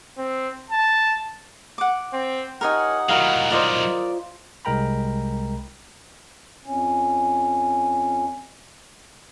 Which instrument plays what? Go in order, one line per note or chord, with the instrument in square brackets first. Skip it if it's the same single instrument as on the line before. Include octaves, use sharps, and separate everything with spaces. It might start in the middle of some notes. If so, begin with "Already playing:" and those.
[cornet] C4
A5
[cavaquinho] F#5 D6
[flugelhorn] C4
[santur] D#4 G4 [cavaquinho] A#4 C#5 G#5 [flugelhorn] F#5
[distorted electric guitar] D#3 F#3 [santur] D#4 E4 A#5 [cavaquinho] F#4 A#4 F5
[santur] F4 C5 [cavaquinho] A#4 D5 D#5
[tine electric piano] C2 G#3 A#4 G5 A#5 B5
[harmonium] F2 C#4